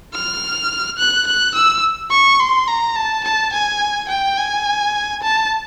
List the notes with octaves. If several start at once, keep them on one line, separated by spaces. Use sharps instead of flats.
F6
F#6
F#6
E6
C#6
C6
A#5
A5
A5
G#5
G5
G#5
A5